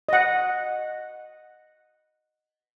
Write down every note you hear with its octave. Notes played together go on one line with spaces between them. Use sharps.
D#5 F#5